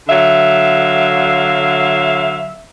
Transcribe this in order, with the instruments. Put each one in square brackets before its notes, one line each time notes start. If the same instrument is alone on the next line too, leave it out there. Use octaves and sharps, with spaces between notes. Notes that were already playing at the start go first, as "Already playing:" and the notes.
[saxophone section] D3 F#3 E5 F5